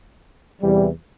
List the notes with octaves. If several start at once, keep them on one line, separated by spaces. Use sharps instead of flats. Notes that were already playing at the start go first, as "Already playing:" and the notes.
E2 C3 E3 G3